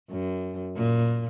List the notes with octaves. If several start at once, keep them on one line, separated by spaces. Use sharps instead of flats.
F#2
A#2